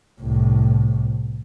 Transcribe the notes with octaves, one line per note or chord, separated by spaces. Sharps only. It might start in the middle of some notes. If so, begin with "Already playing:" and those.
C2 A2